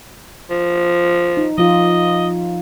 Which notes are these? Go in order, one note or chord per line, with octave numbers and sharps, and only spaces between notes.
F3
D#4
F3 F4 D#5